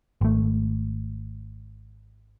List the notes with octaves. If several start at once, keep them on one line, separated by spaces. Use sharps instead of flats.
G#1 A3